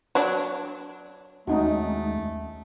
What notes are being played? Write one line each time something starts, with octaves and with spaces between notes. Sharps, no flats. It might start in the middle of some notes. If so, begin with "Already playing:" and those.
F#3 D4 C#5
D#2 G#3 A3 C#4 D#4 F#4